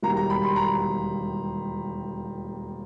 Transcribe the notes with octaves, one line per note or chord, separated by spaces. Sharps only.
E1 D#2 D#3 G3 A#3 A#5
A#5
B5
C6
A#5